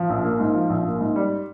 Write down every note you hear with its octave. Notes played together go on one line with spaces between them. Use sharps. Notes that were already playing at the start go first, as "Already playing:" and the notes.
Already playing: F3
A#1
A#3
G#2
F3
A#1
A#3
G#2
G3